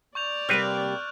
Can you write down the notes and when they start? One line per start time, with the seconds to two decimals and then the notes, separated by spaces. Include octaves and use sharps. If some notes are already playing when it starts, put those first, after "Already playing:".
0.15 D5 C#6 G6 F7
0.49 C3 G3 A#3 C4 B4 F6 F#6